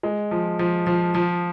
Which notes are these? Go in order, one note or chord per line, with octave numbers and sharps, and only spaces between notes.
G#3
F3
F3
F3
F3